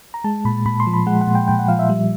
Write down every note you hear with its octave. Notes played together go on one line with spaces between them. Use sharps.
A#5
G#3 A5
A#2 B5
A#2 B5
C6
F3
B5
G#3 F#5
F#5
A#2
G5
A#2 G5
F#5
F3 F5
E5
G3